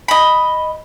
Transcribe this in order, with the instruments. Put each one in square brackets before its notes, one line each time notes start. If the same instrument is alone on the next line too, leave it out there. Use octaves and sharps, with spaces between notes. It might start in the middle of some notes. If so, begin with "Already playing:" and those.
[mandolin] D#5 B5